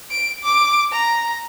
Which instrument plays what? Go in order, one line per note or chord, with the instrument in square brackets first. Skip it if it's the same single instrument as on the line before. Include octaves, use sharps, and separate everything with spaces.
[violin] D7
D6
A#5